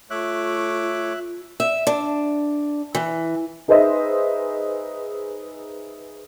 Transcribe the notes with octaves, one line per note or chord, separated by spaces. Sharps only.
A3 F4 C#5 E5 D6 F#6
E5
D4
E3
D#4 G#4 B4 C5 D#5 E5